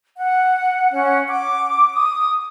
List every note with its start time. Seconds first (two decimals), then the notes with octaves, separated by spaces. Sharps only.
0.17 F#5
0.91 C#4 F#5
1.27 D6
1.93 D#6